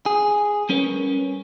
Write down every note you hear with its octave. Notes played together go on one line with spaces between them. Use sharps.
G#4
G3 C#4 A#4 B4 C#5